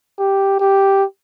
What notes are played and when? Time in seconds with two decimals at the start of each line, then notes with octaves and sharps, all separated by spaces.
0.19 G4
0.60 G4